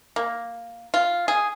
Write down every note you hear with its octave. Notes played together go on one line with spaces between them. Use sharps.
A#3
F4
G#4